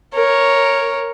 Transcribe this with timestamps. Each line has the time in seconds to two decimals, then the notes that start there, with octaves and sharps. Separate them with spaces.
0.14 A#4 C#5